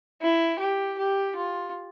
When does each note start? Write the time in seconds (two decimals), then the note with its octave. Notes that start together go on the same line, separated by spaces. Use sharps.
0.22 E4
0.59 G4
0.98 G4
1.36 F4